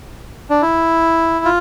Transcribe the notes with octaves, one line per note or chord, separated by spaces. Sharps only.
D4
E4
F4